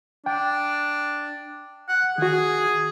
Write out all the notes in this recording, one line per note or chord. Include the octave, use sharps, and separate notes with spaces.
D4 G5
F#5
D#3 F#4 G#4